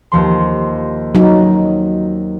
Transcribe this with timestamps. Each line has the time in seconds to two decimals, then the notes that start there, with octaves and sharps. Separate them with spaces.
0.12 D#2 F3 C6
1.15 F#3 D#4